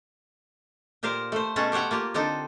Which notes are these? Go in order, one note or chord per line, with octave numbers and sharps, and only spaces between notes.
A#2 G4 A#4 C5 F5
A3 C5
B2 A3 C#4 G#4 A4 F#5
G4 C5 C#5 F#5 G5
A#3 F4 G4
D3 C4 D4 D#4 G4 A4